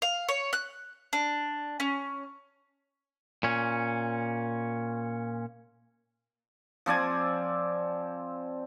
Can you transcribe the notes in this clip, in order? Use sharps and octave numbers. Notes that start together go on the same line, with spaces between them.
F5
C#5
F#6
D4
C#4
A#2 C#4
F3 C4 D5 G#5